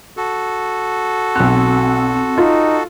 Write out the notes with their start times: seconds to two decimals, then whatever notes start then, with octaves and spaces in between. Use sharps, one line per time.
0.17 F#4 A4
1.36 B1 C4 F#6
2.38 D#4 F4